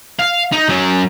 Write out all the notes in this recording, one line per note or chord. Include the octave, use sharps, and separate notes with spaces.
F5
D#4
F#3 C#4